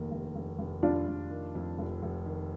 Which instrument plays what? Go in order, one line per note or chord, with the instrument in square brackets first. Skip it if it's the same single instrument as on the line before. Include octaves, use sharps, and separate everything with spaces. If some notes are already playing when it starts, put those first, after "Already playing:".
Already playing: [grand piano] F1 D#2 D#3 [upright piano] A#3
[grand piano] F1
F1
F1
[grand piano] F1 [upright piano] D4 F4
[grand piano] F1
D#3
F2
F1
F1
D#3